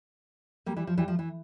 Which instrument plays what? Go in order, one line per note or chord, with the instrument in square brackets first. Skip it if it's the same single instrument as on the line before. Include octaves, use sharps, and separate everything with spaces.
[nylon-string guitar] G3 A#3
E3 G3
F3
E3 G3
F3
E3